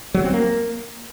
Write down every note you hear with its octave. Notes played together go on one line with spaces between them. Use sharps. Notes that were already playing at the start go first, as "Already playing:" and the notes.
F#3
C4
A#3